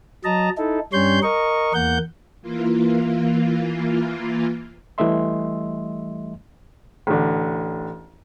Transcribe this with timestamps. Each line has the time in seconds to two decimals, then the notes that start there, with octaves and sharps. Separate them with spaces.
0.24 F#3 D#5 A5 A#5
0.58 D#4 E4 A4
0.93 G2 G3 C#4 C#5 C6 G6
1.23 A#4 D#5 C#6
1.74 E2 A#3 F#5 G6
2.42 E3 A#3 F4
4.98 E3 G3 A3 D#5 E5 C6
7.07 A1 D3